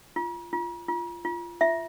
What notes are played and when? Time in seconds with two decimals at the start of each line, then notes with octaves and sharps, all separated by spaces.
0.16 F4
0.53 F4
0.88 F4
1.25 F4
1.61 F4 E5